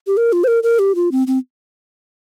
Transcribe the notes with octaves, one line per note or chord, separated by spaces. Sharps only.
G4
A#4
F4
C5
A#4
A#4
G4
F4
C4
C4